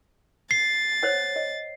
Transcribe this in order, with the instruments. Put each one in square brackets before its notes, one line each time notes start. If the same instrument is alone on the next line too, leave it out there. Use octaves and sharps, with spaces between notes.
[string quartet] A6 [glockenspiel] C7
[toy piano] C5 C#5 F#5
D#5